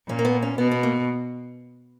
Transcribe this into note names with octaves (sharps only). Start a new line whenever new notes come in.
A#2 C#4
A#3
B3
C#4
B2 B3
B3
A#3